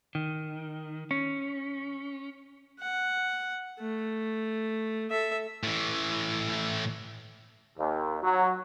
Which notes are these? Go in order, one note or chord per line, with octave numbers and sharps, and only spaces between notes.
D#3
C#4
F#5
A3
A4 E5
A2 E3
D#2
F#3